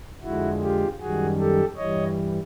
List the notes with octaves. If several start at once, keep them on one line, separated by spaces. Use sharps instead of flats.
F2 D3 F3 G#3 E4 F#4
F4 G4
F#2 D#3 G3 F#4 G#4
G4 A4
G2 E3 G3 C#5 D#5